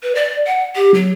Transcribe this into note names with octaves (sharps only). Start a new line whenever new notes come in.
B4
D5
F#5
G4
F#3